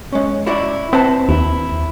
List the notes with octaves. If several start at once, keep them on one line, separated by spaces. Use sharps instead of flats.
G#3 C#4
E4 F#4 D5
C4 B4 C5 A5
D#2 E4